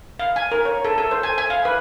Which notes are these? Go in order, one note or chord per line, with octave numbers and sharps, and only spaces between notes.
F5
G#5
A#4
C#5
A4
A4
C5
G#5
G#5
F5
B4